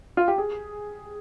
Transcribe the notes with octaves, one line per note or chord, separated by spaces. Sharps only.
F4
G4
G#4